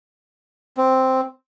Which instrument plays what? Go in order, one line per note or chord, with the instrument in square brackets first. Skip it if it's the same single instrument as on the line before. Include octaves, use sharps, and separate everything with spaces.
[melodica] C4